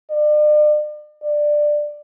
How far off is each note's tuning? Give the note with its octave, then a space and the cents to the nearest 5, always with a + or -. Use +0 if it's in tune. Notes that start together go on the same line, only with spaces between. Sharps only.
D5 +40
D5 +10